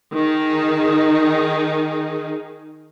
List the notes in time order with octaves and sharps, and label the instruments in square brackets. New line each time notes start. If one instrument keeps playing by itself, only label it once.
[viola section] D#3 D#4 G#4